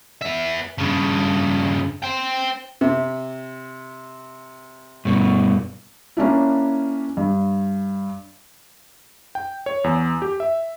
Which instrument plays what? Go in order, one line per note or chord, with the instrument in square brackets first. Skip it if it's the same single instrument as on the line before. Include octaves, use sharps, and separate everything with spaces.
[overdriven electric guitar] B3 E5
G2 C#3
C5 G5
[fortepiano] C3
[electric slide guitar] G2 B2
[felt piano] A#3 C#4 D4 E4
G2
[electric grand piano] G5
C#5
E2
G4
E5